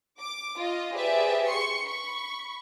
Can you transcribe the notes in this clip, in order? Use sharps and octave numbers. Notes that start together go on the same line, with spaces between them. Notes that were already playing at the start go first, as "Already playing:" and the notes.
D6
F4 D#5
G4 G#4 B4 C5 D5 E5
C6 C#6 C#7
B5 C#6